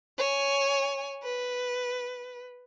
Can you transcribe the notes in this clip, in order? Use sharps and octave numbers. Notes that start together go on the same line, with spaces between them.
C#5 G#5
B4